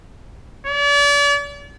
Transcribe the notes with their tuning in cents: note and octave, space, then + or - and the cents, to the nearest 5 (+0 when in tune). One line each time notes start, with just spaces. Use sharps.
D5 -40